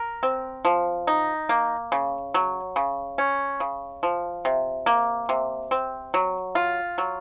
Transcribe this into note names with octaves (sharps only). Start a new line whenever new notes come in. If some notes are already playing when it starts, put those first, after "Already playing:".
Already playing: A#4
C4
F3
D#4
A#3
C#3
F#3
C#3
C#4
C#3
F3
C3
A#3
C3
C4
F#3
F4
F#3